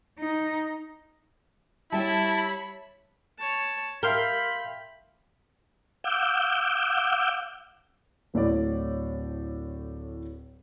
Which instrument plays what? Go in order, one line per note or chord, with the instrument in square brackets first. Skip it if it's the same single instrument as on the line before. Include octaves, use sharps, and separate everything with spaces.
[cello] D#4
[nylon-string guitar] G3 E5 G5 [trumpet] E4 [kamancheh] C#5 B5 [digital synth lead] A5
[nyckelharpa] C#5 A5
[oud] A#4 [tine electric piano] E5 F5 G5 [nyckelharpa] B5 [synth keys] C6 F6 G6
[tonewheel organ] F5 F#5 D6 E6 G6
[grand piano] D1 A2 C#5 D5